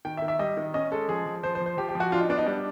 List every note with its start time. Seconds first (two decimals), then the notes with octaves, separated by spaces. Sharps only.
0.05 D#3 G5
0.17 E5
0.22 D#3
0.28 E5
0.39 G3 D#5
0.57 D#3
0.74 C#4 D#5
0.92 G#3 A4
1.08 F3 G#4
1.26 F3
1.43 F3 C5
1.55 C5
1.60 F3
1.66 C5
1.77 F3 G4
1.89 G4
1.95 F3
2.00 F#4
2.12 D4 F4
2.20 D#4
2.29 B3 D4
2.38 D#4
2.46 G3 D4